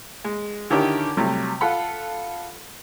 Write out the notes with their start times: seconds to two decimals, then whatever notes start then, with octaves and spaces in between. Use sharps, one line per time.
0.24 G#3
0.70 D3 D#3 C#4 E4 G4 A#4
1.17 C3 F#3 G3 A3
1.61 F4 A4 F#5 B5